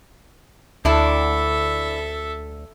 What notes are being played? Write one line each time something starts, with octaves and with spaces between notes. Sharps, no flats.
D2 D4 E4 A4 E5